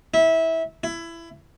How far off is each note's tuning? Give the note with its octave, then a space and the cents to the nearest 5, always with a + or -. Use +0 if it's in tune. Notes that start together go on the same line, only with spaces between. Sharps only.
E4 -20
E4 +20